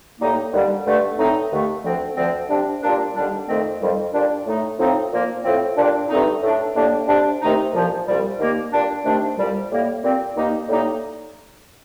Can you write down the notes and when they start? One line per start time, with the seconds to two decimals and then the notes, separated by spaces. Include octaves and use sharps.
0.20 A2 G3 A#3 D#4
0.52 D#2 D3 G3
0.85 G2 D3 A3
1.17 A2 A3 C4 D#4
1.51 D#2 D3 A3
1.83 D2 D3 F3 C4
2.16 D2 D3 F3 C4
2.49 C3 G3 D4
2.82 A#2 G3 A#3 D4
3.15 D#2 D3 G3 D4
3.47 F2 D#3 A3 C4
3.80 F2 D#3 G3
4.13 A#2 G3 D4
4.45 A2 A3 D#4
4.78 A2 F3 C4 D#4
5.11 A#2 F3 A#3
5.44 A2 F3 C4
5.76 A#2 G3 D4
6.09 G2 D3 A3 C4 D#4
6.42 A2 A3 D4
6.75 A2 G3 A#3 D4
7.08 C3 G3 D4
7.41 C3 D#3 A3 D#4
7.74 C2 A#2 F3
8.06 C2 A#2 G3
8.39 D#2 D#3 A#3
8.72 A#2 G3 D4
9.05 C3 D#3 A3 D4
9.37 C2 A#2 G3
9.70 A2 G3 A#3
10.03 A#2 G3 C4
10.36 D#2 D#3 A#3 D#4
10.68 A2 G3 A#3 D#4